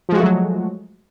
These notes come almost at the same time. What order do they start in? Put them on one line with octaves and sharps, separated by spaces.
F3 G#3 F#4 A3 F#3